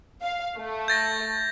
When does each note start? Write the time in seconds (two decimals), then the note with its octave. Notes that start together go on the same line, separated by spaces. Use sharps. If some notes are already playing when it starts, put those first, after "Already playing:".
0.22 F5
0.58 A3
0.88 G6 A6 A#6